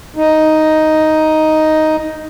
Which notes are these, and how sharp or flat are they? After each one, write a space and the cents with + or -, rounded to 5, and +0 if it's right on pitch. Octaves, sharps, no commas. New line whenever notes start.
D#4 +5